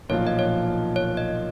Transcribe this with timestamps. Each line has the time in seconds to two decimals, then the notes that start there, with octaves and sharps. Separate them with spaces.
0.09 B1 A#2 F3 A#3 F4 C#5
0.27 D#5
0.39 C#5
0.96 C#5
1.17 D#5